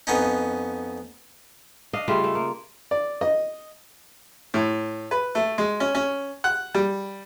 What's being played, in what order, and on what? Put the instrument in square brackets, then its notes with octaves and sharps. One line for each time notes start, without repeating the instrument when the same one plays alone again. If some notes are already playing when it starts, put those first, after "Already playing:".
[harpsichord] F2 B3 C#4 D#4
[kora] D4 D#5 F5
C#3 G3 A3 F4
A3
A#3
[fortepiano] D5
D#5
A2
B4
A3
G#3
C#4
C#4
F#5
G3